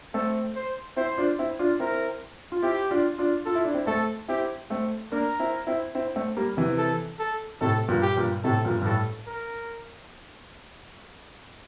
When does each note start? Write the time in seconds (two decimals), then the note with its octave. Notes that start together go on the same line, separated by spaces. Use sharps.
0.14 A3 C4 A4
0.56 C5
0.97 C4 E4 C5
1.18 D4 F4
1.39 C4 E4
1.59 D4 F4
1.80 C4 E4 A#4
2.52 F4
2.62 C4 E4 G4
2.91 D4 F4
3.18 D4 F4
3.45 F4 A4
3.55 E4
3.65 D4
3.74 C4 E4
3.87 A3 C4 A4
4.28 C4 E4 G4
4.70 A3 C4
5.12 A#3 D4 A#4
5.40 C4 E4
5.67 C4 E4
5.95 C4 E4
6.16 A3 C4
6.37 G3 A#3
6.57 C3 E3
6.78 A4
7.19 A4
7.61 A2 C3 A4
7.88 G2 A#2
8.02 G4
8.17 G2 A#2
8.44 A2 C3 A4
8.65 G2 A#2
8.82 G2
8.85 A2 A4
9.27 A#4